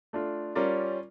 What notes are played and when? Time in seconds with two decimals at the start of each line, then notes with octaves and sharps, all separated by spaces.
0.13 A3 D4 F4
0.55 G3 C#4 F4 A#4 D5